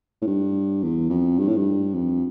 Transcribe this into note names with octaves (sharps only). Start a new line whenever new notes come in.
A2
G2
E2
F2
G2
A2
G2
F2